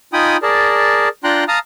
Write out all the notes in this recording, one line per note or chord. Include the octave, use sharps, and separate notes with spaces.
D#4 F4 G5 G#5 B5 D#6
G#4 A#4 D5 A5
D4 F4 G5 A#5 C6 F#6
F5 A5 A#5 D#6 F6